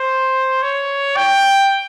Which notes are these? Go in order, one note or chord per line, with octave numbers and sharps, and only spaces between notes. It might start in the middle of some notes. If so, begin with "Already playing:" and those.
Already playing: C5
C#5
G5